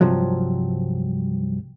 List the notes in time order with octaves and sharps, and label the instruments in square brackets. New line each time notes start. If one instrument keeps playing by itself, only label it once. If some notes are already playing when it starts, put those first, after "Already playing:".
[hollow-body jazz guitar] C2 G2 C3 F3 F#3